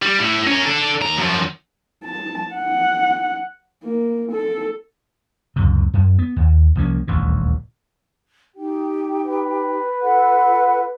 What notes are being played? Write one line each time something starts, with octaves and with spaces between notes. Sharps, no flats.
G3
A2
C#4 A#4
D4 A4
D#2 A#5
F#2 F3
A5
F#5
A#3
A4
C#2 F#2 C3
F#2
B3
D#2
C2 F3 A#3 C#4
D#1 A1 D2 A#2
D#4 G4 G5
B4
F4 A4 F#5